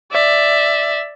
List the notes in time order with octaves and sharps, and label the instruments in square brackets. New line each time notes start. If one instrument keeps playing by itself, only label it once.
[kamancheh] D5 E5